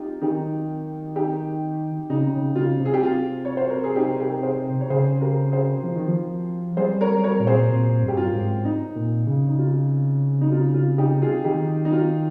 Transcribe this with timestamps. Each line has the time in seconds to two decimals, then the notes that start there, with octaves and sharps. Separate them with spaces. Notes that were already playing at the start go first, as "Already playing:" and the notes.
Already playing: D#4 F4 G4
0.22 D#3 D#4 G4
1.16 D#4 G4
2.10 C#3 D#4
2.33 C#3
2.55 C#3 F4
2.80 C3
2.85 G#4
2.94 G4
3.03 F4
3.45 C#5
3.57 C5
3.70 A#4
3.84 G#4
3.96 D#4 G4
4.20 G4 A#4
4.43 G#4 C5
4.81 C#5
4.90 C#3 G#4 C5
5.21 G4 A#4
5.52 G#4 C5
5.83 F3
5.96 D#3
6.08 F3
6.77 G3 G#4 C5
7.01 A#4 C#5
7.08 G3
7.24 A#4 C#5
7.40 A#2
7.47 G#4 C5
7.71 A#2
8.02 G2
8.08 G4
8.17 F4
8.33 G#2
8.65 D#4
8.96 A#2
9.27 C#3
9.48 D#4
9.58 F4
10.41 D#4
10.52 F4
10.74 F4
10.98 D#4 G4
11.22 F4 G#4
11.45 D#3 D#4 G4
11.85 D#4
11.92 F4